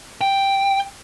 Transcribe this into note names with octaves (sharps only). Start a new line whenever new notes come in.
G5